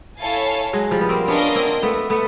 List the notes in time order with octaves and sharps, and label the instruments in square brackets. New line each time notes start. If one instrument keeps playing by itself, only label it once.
[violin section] E4 A4 C#5 F5 G#5
[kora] F#3 G#3
F3 G3
B3
A#3 C4
[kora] B3 C#4 [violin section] D4 F4 A#4 D#5
[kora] A#3 C4
A3 B3
A3 B3